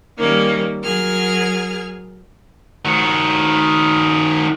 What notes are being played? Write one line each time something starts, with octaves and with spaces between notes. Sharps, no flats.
D#3 G3 A#3 C#4 D#4
F#3 G#4 A#4 F6 G#6
D#3 F#4